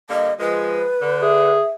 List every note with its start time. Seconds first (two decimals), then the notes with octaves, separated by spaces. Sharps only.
0.10 D3 G3 A#3 D#5
0.40 F3 G#3 B4
1.01 D3
1.22 G#4 E5